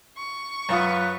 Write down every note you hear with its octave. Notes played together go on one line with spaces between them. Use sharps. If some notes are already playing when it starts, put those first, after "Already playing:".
C#6
F#2 F4 B4 D#6